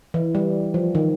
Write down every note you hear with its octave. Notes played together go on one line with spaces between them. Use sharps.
E3
G3
F3
D#3